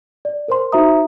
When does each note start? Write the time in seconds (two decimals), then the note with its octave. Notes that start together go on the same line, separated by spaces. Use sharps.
0.25 D5
0.48 A#4 C5 C6
0.72 D#4 F#4 C5 E5 A#5 D#6